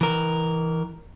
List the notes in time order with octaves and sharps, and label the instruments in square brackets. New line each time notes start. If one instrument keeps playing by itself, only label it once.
[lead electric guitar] E3 A#4